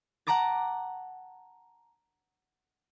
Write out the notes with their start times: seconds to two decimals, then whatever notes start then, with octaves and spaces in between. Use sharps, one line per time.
0.27 F#5 A5 A#5 D6 A6